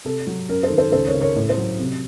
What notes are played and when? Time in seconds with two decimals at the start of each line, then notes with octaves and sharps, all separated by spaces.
0.05 C3 A4
0.27 F#3
0.49 F#2 A#4
0.63 A4 C5
0.70 D#3
0.78 A4 C5
0.92 C#2 A4 C5
1.07 A#4 C#5
1.14 C#3
1.21 A#4 C#5
1.36 A2
1.49 A4 C5
1.57 F#3
1.79 C3